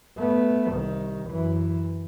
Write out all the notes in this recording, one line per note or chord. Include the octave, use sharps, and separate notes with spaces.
A3 B3
C2 D#3
F#2 E3